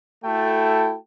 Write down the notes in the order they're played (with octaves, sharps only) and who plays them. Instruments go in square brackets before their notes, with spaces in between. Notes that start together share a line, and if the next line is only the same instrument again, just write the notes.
[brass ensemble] A3 E4 F#4 A4 G5 A5